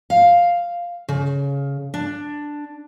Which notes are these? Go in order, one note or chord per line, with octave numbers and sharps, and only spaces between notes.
F5
C#3
D4